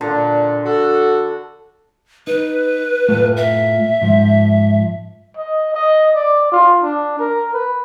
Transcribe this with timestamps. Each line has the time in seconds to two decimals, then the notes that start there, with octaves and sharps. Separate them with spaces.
0.01 A#2 D3
0.65 F#4 A4
2.27 D#4 B4
3.09 A2 A3 F4
3.37 E5
4.01 G#2 F3
5.37 D#5
5.74 D#5
6.15 D5
6.52 F4
6.83 D4
7.19 A#4
7.54 B4